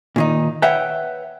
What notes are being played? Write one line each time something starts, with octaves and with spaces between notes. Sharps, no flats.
A#2 D#3 D#4
B4 C#5 E5 F#5 G5